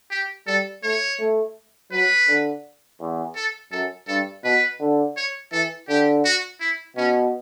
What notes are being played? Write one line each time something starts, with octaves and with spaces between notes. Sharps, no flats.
G4
G3 A4
A3 C#5
A3
F#3 B4
D3
E2
A4
F#2 A4
G2 A4
B2 B4
D3
C#5
E3 A4
D3 G4
F#4
E4
B2 C#4